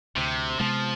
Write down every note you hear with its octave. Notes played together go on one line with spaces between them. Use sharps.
D2 C3
C3 F3 G#3 B3